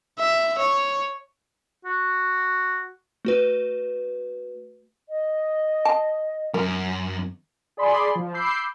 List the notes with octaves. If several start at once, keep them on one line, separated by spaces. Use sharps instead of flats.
E5
C#5
F#4
A3 F#4 B4
D#5
A5
F#2 A#4
G#4 D5 B5 C6
F3
B5 D6 E6 G6 C7